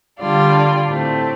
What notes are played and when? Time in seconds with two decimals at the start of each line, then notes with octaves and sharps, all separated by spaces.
0.19 D3 G3 F4 D5
0.87 A2 A3 C4